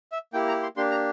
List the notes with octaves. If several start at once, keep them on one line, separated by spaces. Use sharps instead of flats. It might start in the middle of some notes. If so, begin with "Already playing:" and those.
E5
A#3 E4 G4 G5
A#5
C6
A#3 D4 G4 C6
A#5